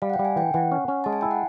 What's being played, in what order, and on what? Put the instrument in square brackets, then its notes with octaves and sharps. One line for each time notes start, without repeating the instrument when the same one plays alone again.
[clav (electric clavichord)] G3 [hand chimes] F5
[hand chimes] F#5
G5
[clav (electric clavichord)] G3
[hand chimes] G#5
[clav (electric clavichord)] E3 [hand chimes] G5
[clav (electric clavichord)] E3 [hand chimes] F#5
[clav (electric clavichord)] C#4
C#4
[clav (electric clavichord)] G#3 [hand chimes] A5
[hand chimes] G#5
[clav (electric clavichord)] E4 [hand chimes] G5
[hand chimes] F#5